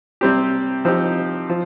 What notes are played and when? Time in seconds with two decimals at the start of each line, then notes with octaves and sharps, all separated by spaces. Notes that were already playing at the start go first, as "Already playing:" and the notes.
0.21 C3 G3 C4 G4
0.85 F3 C4 D#4 G4
1.50 F3